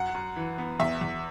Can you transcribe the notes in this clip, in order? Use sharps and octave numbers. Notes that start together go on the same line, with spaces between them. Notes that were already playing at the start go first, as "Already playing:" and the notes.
Already playing: F#2 F#5
F#2
E3
B3
E2 E5
E2